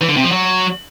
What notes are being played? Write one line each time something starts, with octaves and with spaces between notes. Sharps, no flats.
E3
D3
C3
F3
F#3